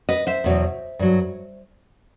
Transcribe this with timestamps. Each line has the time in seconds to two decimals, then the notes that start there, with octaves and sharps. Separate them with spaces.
0.09 B4 D#5
0.27 C5 E5
0.44 E2 B2 F#3
0.99 G2 F#3